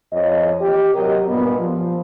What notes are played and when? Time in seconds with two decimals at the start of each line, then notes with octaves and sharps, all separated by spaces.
0.13 F2 C#5 D#5
0.62 G4
0.95 C3 F#3 A#4 D#5
1.28 G2 A#2 B3
1.60 F3